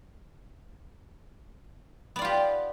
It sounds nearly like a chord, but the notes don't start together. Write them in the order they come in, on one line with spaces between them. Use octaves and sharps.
B3 D5 F4 G4